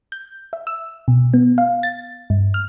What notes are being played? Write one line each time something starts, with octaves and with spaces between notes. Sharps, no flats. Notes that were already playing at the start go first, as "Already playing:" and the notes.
G6
E5
E6
B2
B3
F5
A6
G2
F6